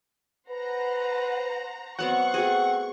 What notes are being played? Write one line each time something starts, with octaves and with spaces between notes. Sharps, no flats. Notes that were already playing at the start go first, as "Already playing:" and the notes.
B4 C5 F#5 A#5
F#3 B3 C4 F#5 C#6
A3 C4 F#4 G#4